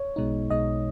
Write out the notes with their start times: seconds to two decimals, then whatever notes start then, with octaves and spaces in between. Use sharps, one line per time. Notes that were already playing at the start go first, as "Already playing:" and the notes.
Already playing: C#5
0.16 B1 B2 G#3 D#4
0.50 B1 B2 G#3 D#4 D#5